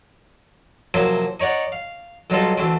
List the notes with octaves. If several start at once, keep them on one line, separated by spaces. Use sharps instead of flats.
C3 F3 F#3 A#3 E4
D#4 C#5 D5 F#5
F5
B1 F#3 G3 D#4 F4 A4
D2 E3 A3 C4